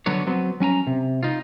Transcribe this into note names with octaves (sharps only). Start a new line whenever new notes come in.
D3 F#3 B3 F#4 C#5
F#3 B3 C4
F#3 C#4 G#5 A#5
C3
D#4 F4